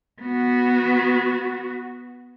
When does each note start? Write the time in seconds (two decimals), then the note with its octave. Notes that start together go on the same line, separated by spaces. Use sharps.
0.22 B3 F#4